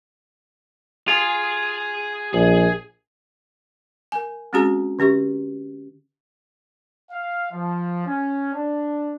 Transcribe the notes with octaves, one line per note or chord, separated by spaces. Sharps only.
F4 G#4 G#5
A#1 G#4
A#4 G#5
G#3 C4 C#4 F#4 G#4 A#5
D3 C#4 G4 C#6
F5
F3
C#4
D4